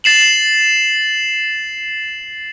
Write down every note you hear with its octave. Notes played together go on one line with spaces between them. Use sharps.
A6 C7 E7 F#7